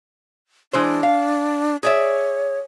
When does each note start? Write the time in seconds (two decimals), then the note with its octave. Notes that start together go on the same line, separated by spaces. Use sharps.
0.73 E3 G#3 D4 C5
1.03 F5
1.83 G#4 C#5 D5 E5